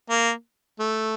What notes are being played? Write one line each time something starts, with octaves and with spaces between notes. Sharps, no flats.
A#3
A3